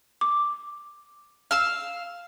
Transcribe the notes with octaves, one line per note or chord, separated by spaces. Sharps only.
D6
F5 E6